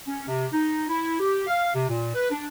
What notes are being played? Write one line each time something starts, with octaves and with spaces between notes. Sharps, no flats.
C#4
C3
D#4
E4
G4
F5
C3
A#2
B4
D4